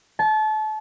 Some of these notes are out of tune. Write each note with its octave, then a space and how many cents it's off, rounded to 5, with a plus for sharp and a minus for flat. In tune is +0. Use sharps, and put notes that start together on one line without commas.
A5 -30